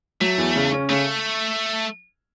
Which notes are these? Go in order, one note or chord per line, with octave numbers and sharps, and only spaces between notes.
F#3 A3
E2
C#3
C#4
C#3 A3